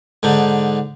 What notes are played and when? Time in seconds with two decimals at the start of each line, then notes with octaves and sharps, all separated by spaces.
0.23 G#2 D3 D4 D#4